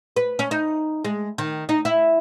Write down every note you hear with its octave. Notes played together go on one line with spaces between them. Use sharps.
B4
C#4
D#4
G#3
D#3
D#4
E4